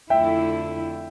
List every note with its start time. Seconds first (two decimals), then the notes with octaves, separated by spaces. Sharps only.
0.10 F2 D3 A3 E4 E5 G5